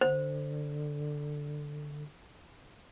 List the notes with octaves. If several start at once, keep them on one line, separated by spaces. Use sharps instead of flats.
D3 C5